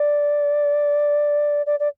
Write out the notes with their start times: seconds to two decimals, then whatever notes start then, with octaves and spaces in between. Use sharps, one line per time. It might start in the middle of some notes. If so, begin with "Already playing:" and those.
Already playing: D5
1.66 D5
1.80 D5